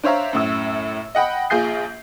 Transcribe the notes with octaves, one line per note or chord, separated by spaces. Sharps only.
D4 C5 C#5 E5 F5 A#5
F#2 A2 E6
D#5 F#5 G5 B5
A#1 F4 G#4 G6 C7